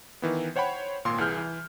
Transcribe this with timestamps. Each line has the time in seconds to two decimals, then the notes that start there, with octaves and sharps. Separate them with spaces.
0.22 D#3 E3 B3
0.56 C5 C#5 F#5 G5 B5
1.05 G#1 A#2 A#3 C6
1.18 C2 E3 G#4 F6 G6
1.38 E3